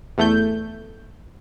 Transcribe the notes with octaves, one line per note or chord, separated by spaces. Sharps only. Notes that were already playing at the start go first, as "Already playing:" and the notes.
E2 A3 G6